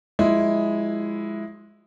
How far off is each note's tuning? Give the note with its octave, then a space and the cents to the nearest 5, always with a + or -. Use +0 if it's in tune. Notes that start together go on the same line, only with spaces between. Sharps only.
F3 +35 G#3 +0 E4 +0